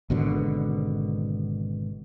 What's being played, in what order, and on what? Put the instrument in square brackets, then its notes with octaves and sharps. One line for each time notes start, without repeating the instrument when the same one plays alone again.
[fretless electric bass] G#1 B2 D3